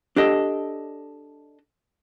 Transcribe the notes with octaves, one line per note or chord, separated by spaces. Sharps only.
D4 G4 A4 D#5